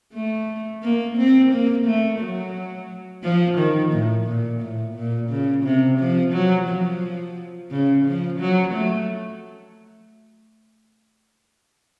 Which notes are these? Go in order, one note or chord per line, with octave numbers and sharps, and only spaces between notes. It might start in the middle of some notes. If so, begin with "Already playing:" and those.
A3
A#3
C4
A#3
A3
F#3
F3
D#3
A2
A#2
A2
A#2
C#3
C3
F3
F#3
F3
C#3
F3
F#3
A3